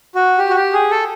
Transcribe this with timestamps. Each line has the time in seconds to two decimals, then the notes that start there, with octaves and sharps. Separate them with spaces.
0.15 F#4
0.38 G4
0.50 F#4
0.56 G4
0.73 G#4
0.91 A4